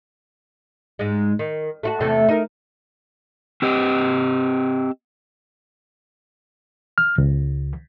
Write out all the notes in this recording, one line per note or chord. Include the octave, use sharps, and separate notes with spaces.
G#2 G#3
D#3
A3 F4 F#4
E2 C3 A3
D#4 A#4
C4 G4 D#5
F6
C#2